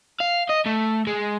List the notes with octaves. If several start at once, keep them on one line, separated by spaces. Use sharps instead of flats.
F5
D#5
A3
G#3